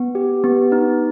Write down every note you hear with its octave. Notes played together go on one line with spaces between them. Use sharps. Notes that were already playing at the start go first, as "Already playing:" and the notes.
Already playing: B3
G4
B3
D#4